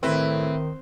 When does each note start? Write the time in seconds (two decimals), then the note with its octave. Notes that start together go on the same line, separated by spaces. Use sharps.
0.03 A2 D#3 C4 E4 B4